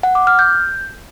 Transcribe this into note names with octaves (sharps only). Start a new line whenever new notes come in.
F#5
D6
F6
G6